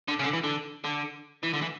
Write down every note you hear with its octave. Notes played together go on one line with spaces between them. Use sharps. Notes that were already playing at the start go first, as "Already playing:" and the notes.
D3
C#3
D3
E3
D3
D3
E3
D3
E3